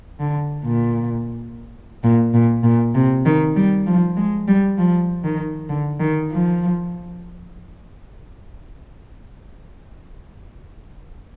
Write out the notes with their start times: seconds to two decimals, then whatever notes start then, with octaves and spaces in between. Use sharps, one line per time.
0.20 D3
0.65 A#2
2.03 A#2
2.34 A#2
2.63 A#2
2.95 C3
3.25 D#3
3.56 G3
3.86 F3
4.17 G#3
4.48 G3
4.78 F3
5.24 D#3
5.69 D3
6.00 D#3
6.31 F3